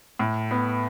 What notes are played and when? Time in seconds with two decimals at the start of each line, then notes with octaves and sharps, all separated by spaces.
0.19 A2
0.51 B3